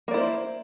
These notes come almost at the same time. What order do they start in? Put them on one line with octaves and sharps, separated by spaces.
A#3 D5 E4 C5